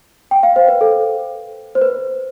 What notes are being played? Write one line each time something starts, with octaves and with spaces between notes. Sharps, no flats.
G5
F5
C5
B4
A4
C5
B4